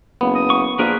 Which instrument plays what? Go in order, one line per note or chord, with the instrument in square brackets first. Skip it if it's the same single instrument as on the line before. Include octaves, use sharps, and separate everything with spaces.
[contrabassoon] F#1 [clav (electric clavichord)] B3
[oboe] D#6
[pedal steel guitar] C#6
[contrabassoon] A#1 [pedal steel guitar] A#3 G#4 A#4 [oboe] B4